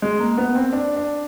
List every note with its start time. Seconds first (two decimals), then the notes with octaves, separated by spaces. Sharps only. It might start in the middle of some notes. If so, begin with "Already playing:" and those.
0.02 G#3
0.20 A#3
0.38 B3
0.55 C4
0.73 D4
0.96 D4